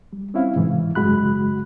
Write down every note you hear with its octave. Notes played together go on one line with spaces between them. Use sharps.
G3
C4 C#4 E4 F5
G#2 C3 E3
F#2 C#3 G#3 F#4 B5 F#6